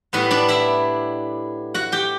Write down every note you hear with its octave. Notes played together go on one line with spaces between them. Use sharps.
A2 G3 B3 B4
D4 D5
E4 E5
F#4 F#5
G4 G5